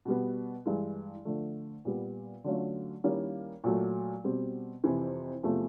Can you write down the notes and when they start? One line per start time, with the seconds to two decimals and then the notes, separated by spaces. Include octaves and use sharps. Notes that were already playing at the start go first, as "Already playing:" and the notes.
0.05 B2 G3 B3
0.66 G2 E3 G#3
1.25 D3 F3 A3
1.85 A#2 G3 B3
2.44 D3 F#3 A3 C#4 F4
3.04 D#3 G3 A#3 C#4 E4
3.64 A#2 F#3 A3
4.24 B2 G3 C4
4.84 F2 C3 E3
5.43 E2 C3 F3 A3